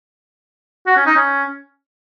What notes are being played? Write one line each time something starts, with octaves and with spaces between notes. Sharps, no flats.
F#4
C#4
D#4
C#4